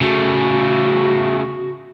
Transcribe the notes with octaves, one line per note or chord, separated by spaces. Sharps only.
C#3 A3 F#4